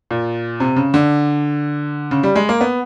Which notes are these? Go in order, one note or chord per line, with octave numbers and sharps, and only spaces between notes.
A#2
C3
C#3
D3
C#3
G3
G#3
A#3
B3